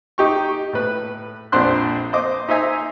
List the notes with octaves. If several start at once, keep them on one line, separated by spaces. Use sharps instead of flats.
D#4 G4 C#6
A2 B4
A#1 F2 D4 C5 C6 F#6
C5 D#5 D6
D#4 C5 E5 G#5 A#5